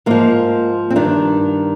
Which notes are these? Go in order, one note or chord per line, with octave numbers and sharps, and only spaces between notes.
G#2 F3 A#3
C4
G2 D#3 D4